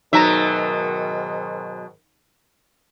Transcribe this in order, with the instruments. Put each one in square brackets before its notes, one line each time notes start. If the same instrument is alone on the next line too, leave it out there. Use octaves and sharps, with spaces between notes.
[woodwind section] G#2 D#3 [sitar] B2 F#3 E5 [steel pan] D#4 A#5